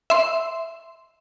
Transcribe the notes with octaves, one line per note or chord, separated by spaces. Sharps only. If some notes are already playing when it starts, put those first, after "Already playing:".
E5 C6